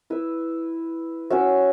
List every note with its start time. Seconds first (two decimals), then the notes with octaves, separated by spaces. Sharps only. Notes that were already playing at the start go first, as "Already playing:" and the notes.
0.10 E4 B4 E5
1.30 C#4 F#4 C#5 E5